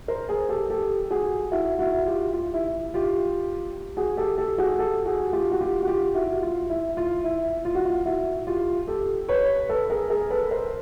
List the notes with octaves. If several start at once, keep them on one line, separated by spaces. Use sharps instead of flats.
A#4 C5
G#4 A#4
G4 A4
G4 A4
F#4 G#4
E4 F#4
E4 F#4
F4 G4
F4
E4
F4 G4
F#4 G#4
G4 A4
G4 A4
F#4 G#4
G4 A4
F#4 G#4
F4 G4
F#4
F4 G4
F#4
F4 G4
E4 F#4
F4
E4
F4
E4
F4
F#4
F4
E4 F#4
F4 G4
G4 A4
B4 C#5
A4 B4
G#4 A#4
G#4 A#4
A4 B4
A#4 C5